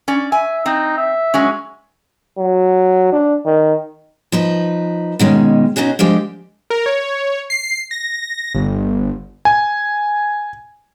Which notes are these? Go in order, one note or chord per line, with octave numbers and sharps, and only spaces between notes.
C#4 D5
E5 G#5
C4 D#4
E5
F#3 G#3 C#4
F#3
D4
D#3
F3 D#4 B4
B2 D#3 G#3 C#4
B2 C#4 D#4 F#4 G#4
D3 F3 G#3 G4 C5
A#4
C#5
C7
A#6
G1
G#5